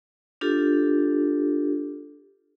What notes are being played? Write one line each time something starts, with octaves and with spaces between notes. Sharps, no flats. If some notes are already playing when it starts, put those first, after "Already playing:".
D4 F4 G4 A4